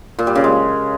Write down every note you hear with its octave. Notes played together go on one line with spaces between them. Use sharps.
A#2
G3
C#3
G#3